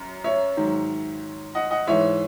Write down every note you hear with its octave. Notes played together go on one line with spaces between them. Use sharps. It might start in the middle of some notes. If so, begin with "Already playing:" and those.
Already playing: F#2
C#5 E5
G#2 D#3 F#3
D#5 F#5
D#5 F#5
G#2 E3 C#5 E5